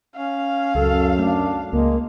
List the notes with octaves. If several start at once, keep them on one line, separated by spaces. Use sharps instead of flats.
C#4 F5
C#2 F#2 A4
A3 D4
C#2 G#3 A#3